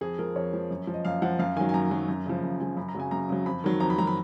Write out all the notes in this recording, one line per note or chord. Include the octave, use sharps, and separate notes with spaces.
F2 G#4
F3 A#4
F2 C#5
F3
F#2
F3
D#5
F#2 F5
F3 F#5
F#2 F5
D#3 F#3 G#5
G#5
F#2 A#5
D#3 F#3
F#2
C#3 F3
F#2
C#3 F3 G#5
F#2 B5
A#5
C#3 F#3 G#5
F#2 A#5
C#3 F#3
F2 B5
D#3 F#3
F2 A#5
B5
D#3 F#3 A#5
B5